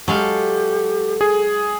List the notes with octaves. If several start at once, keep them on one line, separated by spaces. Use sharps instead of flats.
F#3 G#3 G4 A4 F5
G#4